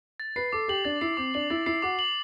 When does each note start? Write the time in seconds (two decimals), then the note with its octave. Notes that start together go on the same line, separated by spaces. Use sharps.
0.20 A6
0.36 B4 C7
0.53 A4 D6
0.68 G4 F#7
0.85 D4 A6
1.01 E4 C7
1.17 C4 D6
1.34 D4 F#7
1.50 E4 A6
1.66 E4 C7
1.82 F#4 D6
1.99 F#7